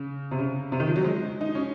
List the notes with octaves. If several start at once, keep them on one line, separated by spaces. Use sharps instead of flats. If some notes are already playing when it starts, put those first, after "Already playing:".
Already playing: C#3
C3
C#3
C3
D#3
F3
F#3
G#3
D#4
C#4